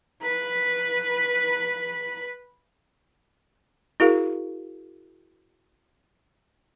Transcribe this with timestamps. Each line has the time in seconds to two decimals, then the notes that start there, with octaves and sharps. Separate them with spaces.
0.22 B4 B5
4.00 E4 F#4 G#4 A#4 F5